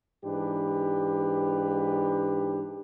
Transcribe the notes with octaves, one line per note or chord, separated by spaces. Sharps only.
G#2 E3 D4 G4 B4